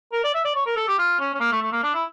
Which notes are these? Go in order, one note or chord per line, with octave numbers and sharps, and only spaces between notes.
A#4
D5
E5
D5
C#5
A#4
A4
G4
F4
C#4
C#4
A#3
A3
A3
A#3
D4
E4